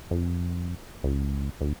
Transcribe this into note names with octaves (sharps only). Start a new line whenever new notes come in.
F2
C#2
D2